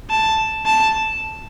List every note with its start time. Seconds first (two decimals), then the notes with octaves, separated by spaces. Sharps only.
0.10 A5
0.66 A5